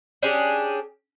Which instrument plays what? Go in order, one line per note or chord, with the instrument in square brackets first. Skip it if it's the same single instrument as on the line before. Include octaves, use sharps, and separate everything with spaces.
[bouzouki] C#4 D4 G4 G#4